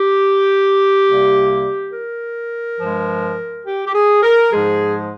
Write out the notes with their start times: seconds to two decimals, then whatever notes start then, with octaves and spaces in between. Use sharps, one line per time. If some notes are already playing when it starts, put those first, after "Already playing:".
Already playing: G4
1.07 C2 C3 G3 A#3
1.93 A#4
2.79 G2 F3 G#3
3.66 G4
3.86 G4
3.94 G#4
4.22 A#4
4.51 G#2 F3 G#3 G#4